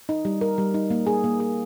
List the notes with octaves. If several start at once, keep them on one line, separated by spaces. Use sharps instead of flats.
D#4
G3
A#4
G3
D#4
A#3
G#4
A#3
G#4